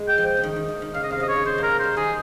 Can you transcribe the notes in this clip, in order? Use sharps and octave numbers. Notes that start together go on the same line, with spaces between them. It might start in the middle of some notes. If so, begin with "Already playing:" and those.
Already playing: G#3
G5
F3
G5
C#3
D#3
D#3
D#3
D#3
C#3 F5
D#5
C3 F5
C#3 D#5
C#5
D#3
C#3 C5
A#3 A#4
G#3
G3 C5
D#3 G#4